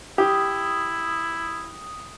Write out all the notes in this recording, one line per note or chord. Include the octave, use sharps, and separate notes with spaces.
E4 G4 D#6